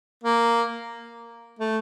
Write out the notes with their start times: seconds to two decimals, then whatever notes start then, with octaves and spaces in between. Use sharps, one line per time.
0.24 A#3
1.59 A3